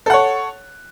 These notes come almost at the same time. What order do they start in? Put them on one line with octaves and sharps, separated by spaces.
A4 F#5 C#5